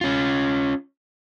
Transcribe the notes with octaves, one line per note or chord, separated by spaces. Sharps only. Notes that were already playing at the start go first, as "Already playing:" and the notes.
C#4 F4